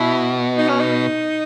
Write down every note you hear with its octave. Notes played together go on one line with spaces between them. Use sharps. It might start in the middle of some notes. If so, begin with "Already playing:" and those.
Already playing: B2 E4
D#4
C#4
D#4